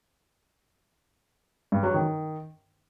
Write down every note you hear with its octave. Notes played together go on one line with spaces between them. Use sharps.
G2
F#3
D#3